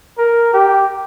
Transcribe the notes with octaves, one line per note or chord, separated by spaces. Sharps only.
A#4
G4